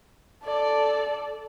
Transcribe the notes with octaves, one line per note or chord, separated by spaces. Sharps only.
A4 D5